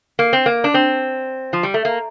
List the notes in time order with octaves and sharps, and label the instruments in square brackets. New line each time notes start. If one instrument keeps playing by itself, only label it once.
[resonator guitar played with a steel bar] A#3
C4
A#3
D4
C4
F3
G3
A3
A#3